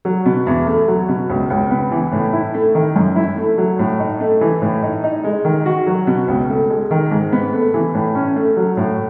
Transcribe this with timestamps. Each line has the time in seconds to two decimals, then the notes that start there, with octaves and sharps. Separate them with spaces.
0.05 F#3
0.26 B2
0.47 E2
0.67 A3
0.88 F#3
1.08 B2
1.29 C#2
1.50 C#2
1.71 B3
1.91 E3
2.12 A2
2.33 E4
2.54 A3
2.75 D#3
2.96 F#2
3.16 E4
3.37 A3
3.58 F#3
3.79 A2
4.00 D#4
4.20 A3
4.41 E3
4.62 A2
4.83 D#4
5.04 D#4
5.24 G#3
5.45 D#3
5.66 F#4
5.87 F#3
6.07 B2
6.28 C#2
6.49 A3
6.70 G#3
6.91 D#3
7.11 G#2
7.32 B3
7.53 A3
7.74 E3
7.94 A2
8.15 C#4
8.36 A3
8.57 F#3
8.77 A2